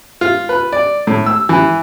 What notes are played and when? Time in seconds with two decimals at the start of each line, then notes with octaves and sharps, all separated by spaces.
0.21 F4
0.49 B4
0.72 D5
1.07 A2
1.26 E6
1.49 E3